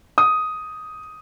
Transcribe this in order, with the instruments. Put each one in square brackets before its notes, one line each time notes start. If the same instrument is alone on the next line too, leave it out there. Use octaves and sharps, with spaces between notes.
[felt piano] D#6